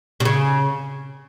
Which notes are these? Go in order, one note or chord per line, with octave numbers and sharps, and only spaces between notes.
C3
C#3